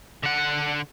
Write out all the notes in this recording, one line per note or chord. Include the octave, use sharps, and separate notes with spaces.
D3 F#5